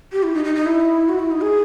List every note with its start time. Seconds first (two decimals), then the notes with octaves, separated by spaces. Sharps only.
0.13 G4
0.23 E4
0.34 D#4
0.44 D#4
0.55 D#4
0.66 E4
1.09 F#4
1.19 E4
1.31 D#4
1.41 G#4